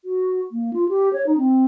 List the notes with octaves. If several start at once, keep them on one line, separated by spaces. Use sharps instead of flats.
F#4
A#3
F4
G4
C#5
D#4
C4